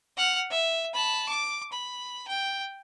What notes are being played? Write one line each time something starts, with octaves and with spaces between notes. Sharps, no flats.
F#5 F6
E5
A5 B5
D6
B5
G5